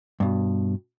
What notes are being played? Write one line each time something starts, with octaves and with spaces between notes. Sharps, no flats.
G2 B2